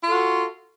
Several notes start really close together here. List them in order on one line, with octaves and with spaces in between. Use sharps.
F4 A4 F#4